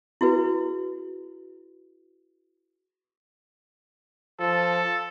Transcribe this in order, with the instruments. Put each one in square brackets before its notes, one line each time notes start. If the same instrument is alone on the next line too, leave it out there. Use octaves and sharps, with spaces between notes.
[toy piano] E4 F#4 G#4 B4
[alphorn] F3 [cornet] A4